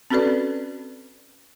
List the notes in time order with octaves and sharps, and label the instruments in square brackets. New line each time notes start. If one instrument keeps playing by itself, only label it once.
[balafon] C4 C#4 F#4 A4 B4 D5